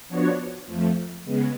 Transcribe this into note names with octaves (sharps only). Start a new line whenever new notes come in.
F3 B3 D4 F#4 C#5
F2 F3 A3
C#3 G#3 B3